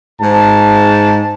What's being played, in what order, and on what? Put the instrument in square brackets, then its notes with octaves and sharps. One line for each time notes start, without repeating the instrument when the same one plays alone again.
[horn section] G#2 A5